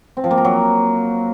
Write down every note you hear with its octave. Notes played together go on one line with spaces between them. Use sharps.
C4
F3
A#3
A#4
F#3